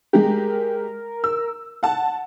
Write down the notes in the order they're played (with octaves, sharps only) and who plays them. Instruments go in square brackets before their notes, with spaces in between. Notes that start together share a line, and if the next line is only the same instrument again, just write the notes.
[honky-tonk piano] G#3 G4 [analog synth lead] A#4
[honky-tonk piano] E6
F#5 A5